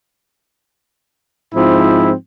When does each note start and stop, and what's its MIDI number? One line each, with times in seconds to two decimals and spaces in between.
1.55 2.12 44
1.55 2.12 53
1.55 2.12 60
1.55 2.12 64